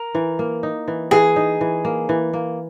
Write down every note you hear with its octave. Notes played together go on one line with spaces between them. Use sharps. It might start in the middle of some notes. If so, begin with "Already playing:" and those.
Already playing: A#4
E3
A#3
D#4
E3
E3 G#4
D#4
E3
A#3
E3
A#3